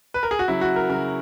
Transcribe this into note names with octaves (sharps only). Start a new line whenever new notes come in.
B4
A#4
G#4
F#4
C#3 F#3 E4
F#4
A#4
C#3 F#3 A#4